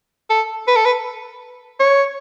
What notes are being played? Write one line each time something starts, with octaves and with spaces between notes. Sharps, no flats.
A4
B4
A4
B4
C#5